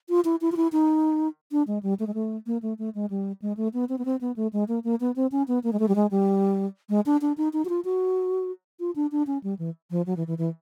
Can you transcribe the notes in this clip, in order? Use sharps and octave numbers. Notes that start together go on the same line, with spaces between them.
F4
E4
E4
F4
E4
D#4
D4
G#3
G3
A3
G#3
A3
A#3
A3
A3
G#3
G3
G#3
A3
B3
C4
B3
C4
B3
A3
G#3
A#3
A#3
B3
C4
C#4
B3
A#3
G#3
A3
G3
G#3
G3
G#3
D4
D4
D#4
D#4
F#4
F4
F#4
F4
D4
D4
C#4
G3
E3
F3
F#3
E3
E3
E3